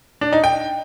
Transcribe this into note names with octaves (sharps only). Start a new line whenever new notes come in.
D4
D#4
G5